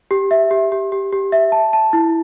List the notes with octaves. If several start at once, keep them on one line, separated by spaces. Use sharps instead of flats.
G4
E5
G4
G4
G4
G4
E5
A5
A5
E4